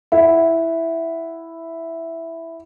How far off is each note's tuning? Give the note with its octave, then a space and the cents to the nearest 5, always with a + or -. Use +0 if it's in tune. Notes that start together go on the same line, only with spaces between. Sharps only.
E4 +0 F#5 +0